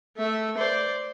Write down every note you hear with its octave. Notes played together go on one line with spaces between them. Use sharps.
A3 E5
C5 D5